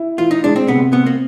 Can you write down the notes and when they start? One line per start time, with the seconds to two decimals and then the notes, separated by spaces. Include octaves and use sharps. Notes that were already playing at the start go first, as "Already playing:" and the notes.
Already playing: E4
0.18 E3 F4
0.31 D#4
0.44 G#3 D4
0.56 C4
0.68 C3 B3
0.93 B3 C4
1.06 A#3